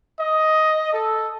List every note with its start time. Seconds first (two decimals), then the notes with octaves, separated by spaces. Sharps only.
0.20 D#5
0.93 A4